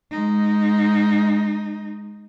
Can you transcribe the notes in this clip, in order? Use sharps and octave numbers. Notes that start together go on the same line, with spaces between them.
G#3 D#4